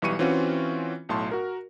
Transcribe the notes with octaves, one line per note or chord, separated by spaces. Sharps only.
B1 E3 G3 C#6 C#7 D#7
E3 C4 C#4 F4 F#4
B1 A2 A5 C6
F#4 A#4